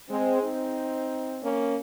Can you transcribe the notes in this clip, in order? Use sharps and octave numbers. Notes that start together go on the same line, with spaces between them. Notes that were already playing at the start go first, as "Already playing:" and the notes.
G#3 C4
C4 D#4
A#3 C#4